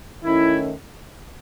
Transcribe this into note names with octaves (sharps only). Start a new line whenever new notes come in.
D#3 A3 C#4 E4